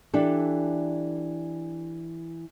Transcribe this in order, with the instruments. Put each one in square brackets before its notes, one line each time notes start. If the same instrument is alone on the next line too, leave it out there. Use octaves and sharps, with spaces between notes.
[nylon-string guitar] E3 D4 G4 A4